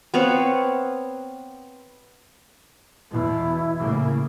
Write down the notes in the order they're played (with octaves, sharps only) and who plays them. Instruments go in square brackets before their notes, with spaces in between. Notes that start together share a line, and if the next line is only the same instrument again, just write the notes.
[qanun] B3 C4 C#5 F5
[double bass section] E2 B2 [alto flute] E4
[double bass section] A2 C#3 A#3